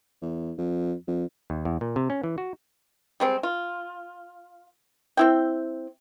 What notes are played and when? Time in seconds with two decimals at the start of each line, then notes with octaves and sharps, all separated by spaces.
0.22 E2
0.58 F2
1.08 F2
1.50 D#2
1.65 E2
1.81 A#2
1.96 C3
2.10 C#4
2.24 E3
2.38 F#4
3.20 G3 G#3 C4
3.43 F4
5.17 C4 E4 G5